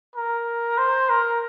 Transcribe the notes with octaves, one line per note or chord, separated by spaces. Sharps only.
A#4
C5
A#4